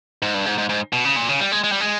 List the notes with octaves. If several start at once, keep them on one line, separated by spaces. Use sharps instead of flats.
G#2
G2
G#2
G#2
G#2
B2
C#3
A#2
C#3
G3
G#3
G#3
G3
G#3